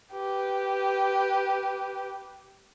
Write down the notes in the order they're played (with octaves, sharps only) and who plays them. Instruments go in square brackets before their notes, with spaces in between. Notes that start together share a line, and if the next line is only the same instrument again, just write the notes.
[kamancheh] G4 B4